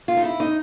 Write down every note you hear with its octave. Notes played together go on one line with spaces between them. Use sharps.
F4
D#4
E4
D#4